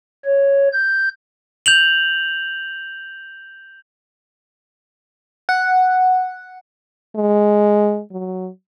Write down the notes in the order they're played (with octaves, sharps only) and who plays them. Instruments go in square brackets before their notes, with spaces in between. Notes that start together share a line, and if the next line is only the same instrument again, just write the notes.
[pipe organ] C#5
G6
[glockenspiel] G6 F7 F#7
[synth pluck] F#5
[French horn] G#3
F#3